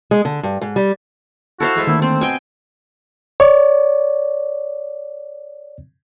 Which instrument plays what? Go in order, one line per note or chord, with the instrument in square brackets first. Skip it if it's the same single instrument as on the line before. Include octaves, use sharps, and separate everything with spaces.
[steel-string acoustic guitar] G#3
D3
G2
G#2
G3
[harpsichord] E4 [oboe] F#4 [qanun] A4 C5 F5
[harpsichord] E3 G#3 B4
[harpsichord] D2 [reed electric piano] D#3 A#3 [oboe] E4
[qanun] C4 [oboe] C5
[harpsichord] B2 [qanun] G5 G#5
[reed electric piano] C#5 D5